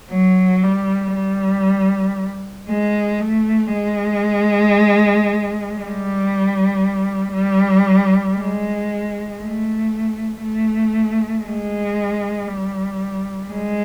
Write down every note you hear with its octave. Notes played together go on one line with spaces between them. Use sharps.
F#3
G3
G3
G#3
A3
G#3
G3
G3
G#3
A3
A3
G#3
G3
G#3